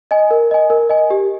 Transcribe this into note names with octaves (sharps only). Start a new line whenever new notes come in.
D#5 G#5
A#4
D#5 G#5
A#4
D#5 G#5
G4